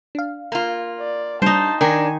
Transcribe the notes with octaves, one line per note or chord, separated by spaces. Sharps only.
D4 F5
A#3 F4
D5
G3 D4 D#4 C5 A5
D#3 D4 A#4 G#5 G#6